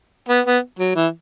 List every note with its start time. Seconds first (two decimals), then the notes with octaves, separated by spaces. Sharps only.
0.29 B3
0.46 B3
0.79 F#3
0.96 E3